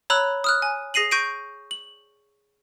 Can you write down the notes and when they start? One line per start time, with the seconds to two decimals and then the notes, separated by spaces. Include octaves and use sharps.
0.10 C#5 A#5 B5 E6 F#6
0.44 D#6 F6 F#6
0.62 G#5
0.94 G#4 A#6 C7 D#7 F#7
1.11 C#6 G6 A#6 D7 D#7
1.71 F#7